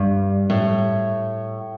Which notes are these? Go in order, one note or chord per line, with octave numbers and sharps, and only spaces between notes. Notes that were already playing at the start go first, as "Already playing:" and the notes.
Already playing: G2
A2